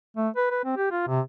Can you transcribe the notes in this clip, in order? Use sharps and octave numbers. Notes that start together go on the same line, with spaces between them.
A3
B4
B4
C4
G4
F4
C3